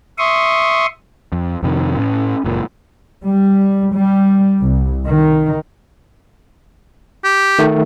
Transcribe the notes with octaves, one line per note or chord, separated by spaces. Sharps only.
E5 C6 C#6 D#6
F2
F2 C3 D#3
A2 C#4
F#1 A#2
G3
G3
C2
D#3
G4
D#3 A3